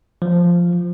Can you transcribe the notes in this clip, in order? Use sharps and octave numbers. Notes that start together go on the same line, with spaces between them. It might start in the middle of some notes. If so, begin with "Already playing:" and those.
F3